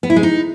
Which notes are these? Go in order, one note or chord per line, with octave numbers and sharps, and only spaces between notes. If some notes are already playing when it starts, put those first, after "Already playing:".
B3
E4
G#3
D#4